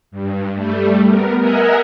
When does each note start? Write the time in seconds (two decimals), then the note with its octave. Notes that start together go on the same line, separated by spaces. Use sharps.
0.11 G2
0.55 G3 A3
1.07 B3 A#4
1.40 A#4 D#5 E5 F#5 G#5 A#5